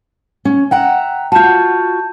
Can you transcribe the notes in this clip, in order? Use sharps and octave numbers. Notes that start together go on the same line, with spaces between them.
C#4
E5 F#5 G5 A#5
F4 F#4 A5 G6